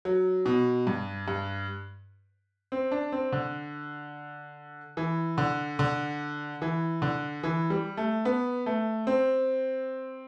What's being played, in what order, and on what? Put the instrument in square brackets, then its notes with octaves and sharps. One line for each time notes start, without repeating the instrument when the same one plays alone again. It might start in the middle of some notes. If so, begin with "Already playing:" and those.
[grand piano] F#3
B2
G2
G2
C4
D4
C4
D3
E3
D3
D3
E3
D3
E3
G3
A3
B3
A3
C4